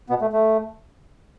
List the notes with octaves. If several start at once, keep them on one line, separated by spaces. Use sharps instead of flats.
B2 B3
A3
A3